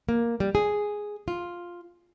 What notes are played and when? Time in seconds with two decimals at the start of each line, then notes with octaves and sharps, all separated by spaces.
0.09 A#3
0.40 G3
0.55 G#4
1.28 F4